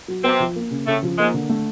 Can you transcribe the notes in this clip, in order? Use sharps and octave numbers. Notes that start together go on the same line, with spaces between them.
F#3
C3 B3 C4
F3
A#3
C#3
A2 C#3 A3
F3
G#2 G#3 A#3
D3
A3